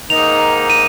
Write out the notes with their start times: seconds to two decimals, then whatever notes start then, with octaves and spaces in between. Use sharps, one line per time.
0.10 G#2 D#3 A#3 D#4 F7
0.70 D#7